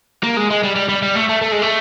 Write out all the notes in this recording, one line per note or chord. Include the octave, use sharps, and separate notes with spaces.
A#3
G#3
G#3
G3
G3
G3
G3
A3
A3
A3
G#3
A3